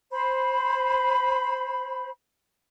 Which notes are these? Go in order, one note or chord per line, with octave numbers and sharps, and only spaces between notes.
C5 B5